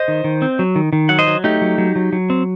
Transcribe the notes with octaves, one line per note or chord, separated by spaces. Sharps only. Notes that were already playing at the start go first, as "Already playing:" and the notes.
Already playing: C5 D#5
D#3
D#3
C4
F#3
D#3
D#3
F#3 F#5
C5 D#5
F#3
A3 D#4 G4
F#3
F#3
F#3
F#3
C4